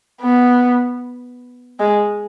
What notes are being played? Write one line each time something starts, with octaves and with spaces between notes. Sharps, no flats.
B3
G#3